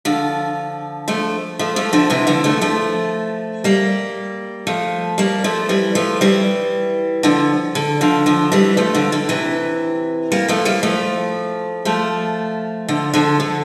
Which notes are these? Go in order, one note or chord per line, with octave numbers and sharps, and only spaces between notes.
D3 F3
F3 A3
F3 A3
F3 A3
D3 F3
C3 E3
D3 F3
F3 A3
F3 A3
G3 A#3
F3 A3
G3 A#3
F3 A3
E3 G3
F3 A3
E3 G3
D3 F3
D3
D3 F3
D3 F3
E3 G3
F3 A3
D3 F3
D3
C3 E3
G3 A#3
F3 A3
G3 A#3
F3 A3
F3 A3
D3 F3
D3 F3
D3